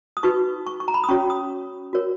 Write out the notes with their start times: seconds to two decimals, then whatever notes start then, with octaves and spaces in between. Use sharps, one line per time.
0.17 D#6
0.23 D#4 F#4 B4 C#6
0.67 C#6
0.80 C#6
0.88 A#5
0.94 B5
1.04 D#6
1.09 C#4 F#4 C#5 C#6
1.30 D#6
1.93 F#4 A#4 C#5